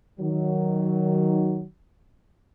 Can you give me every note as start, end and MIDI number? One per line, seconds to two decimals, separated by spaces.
0.20 1.63 51
0.20 1.63 54